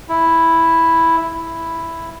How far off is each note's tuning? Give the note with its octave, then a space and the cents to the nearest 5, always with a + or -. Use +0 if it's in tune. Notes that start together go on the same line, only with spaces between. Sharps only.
E4 +0
E4 +0